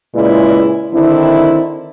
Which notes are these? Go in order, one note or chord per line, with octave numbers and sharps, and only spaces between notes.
A#2 C#3 G#3 E4 B4 D5
D3 D#3 C4 E4